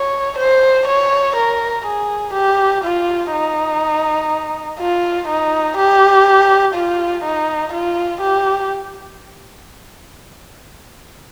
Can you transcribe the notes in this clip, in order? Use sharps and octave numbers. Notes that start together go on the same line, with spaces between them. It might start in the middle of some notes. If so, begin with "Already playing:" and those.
Already playing: C#5
C5
C#5
A#4
G#4
G4
F4
D#4
F4
D#4
G4
F4
D#4
F4
G4